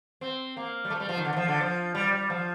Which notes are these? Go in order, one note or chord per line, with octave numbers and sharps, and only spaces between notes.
C4
A#3
G3
A3
F3
G3
F3
D#3
D3
D#3
F3
D3
F3
G3
G3
F3